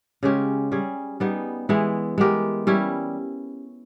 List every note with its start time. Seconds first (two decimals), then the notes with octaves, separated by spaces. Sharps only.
0.23 C#3 G#3 C#4 G4
0.72 G3 C#4 G#4
1.20 G3 B3 D#4 G#4
1.69 E3 G#3 B3 E4
2.18 G#3 B3 G4 A#4
2.67 G3 C#4 E4